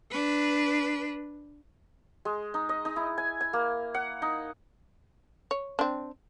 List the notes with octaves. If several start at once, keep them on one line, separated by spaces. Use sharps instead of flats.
D4 B4
G#3
D#4
D#5
D#4
E4
G#5
G#5
A#3
F#5
D#4
C#5
C4 D4